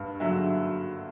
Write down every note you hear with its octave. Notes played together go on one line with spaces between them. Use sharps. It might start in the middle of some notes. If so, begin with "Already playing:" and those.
Already playing: G2
D3 F#3 E5